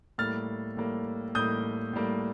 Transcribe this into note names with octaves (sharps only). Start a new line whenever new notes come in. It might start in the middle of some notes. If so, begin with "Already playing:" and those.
A2 G3 A#3 F6 A6
A2 G3 A#3
A2 G3 A#3 D#6 G6
A2 G3 A#3